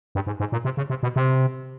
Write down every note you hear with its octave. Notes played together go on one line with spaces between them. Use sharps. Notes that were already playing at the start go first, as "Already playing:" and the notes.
G2
G#2
G#2
A#2
C3
C#3
C3
B2
C3